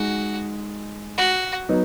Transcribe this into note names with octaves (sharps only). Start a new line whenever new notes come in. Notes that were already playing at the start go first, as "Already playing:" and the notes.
Already playing: G#3 D#4 F#4 G#4
F#4
F#3 B3 D#4